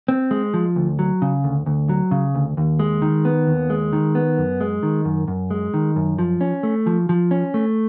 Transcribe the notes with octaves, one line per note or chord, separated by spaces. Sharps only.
C4
G#3
F3
D2
F#3
C#3
D2
D2
F#3
C#3
D2
D#2
G#3
D#3
B3
D#2
G#3
D#3
B3
F#2
G#3
D#3
F#2
F#2
G#3
D#3
F#2
F3
C#4
A3
F3
F3
C#4
A3